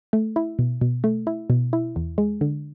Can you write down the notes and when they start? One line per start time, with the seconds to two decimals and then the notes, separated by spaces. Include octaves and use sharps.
0.13 A3
0.36 E4
0.59 B2
0.81 B2
1.04 A3
1.27 E4
1.50 B2
1.73 E4
1.96 E2
2.18 G#3
2.41 D3